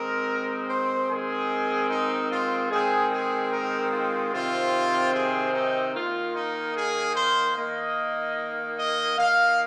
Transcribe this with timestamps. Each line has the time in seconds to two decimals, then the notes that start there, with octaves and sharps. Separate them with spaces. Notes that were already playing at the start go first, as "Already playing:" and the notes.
Already playing: D#3 G#3 C4 A#4
0.69 C5
1.09 D#3 G#3 C4 G#4
1.89 D#4
2.30 F4
2.70 D#3 G#3 C4 G#4
3.12 G#4
3.51 A#4
3.92 F4
4.32 C3 D#3 C4 F4
5.13 G#4
5.54 D#4
5.94 D#3 A#3 F4
6.34 D#4
6.75 G#4
7.15 C5
7.55 D#3 A#3 D#5
8.78 D#5
9.17 D#3 A#3 F5